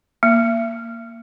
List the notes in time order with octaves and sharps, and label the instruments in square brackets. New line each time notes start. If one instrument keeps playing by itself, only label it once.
[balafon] A#3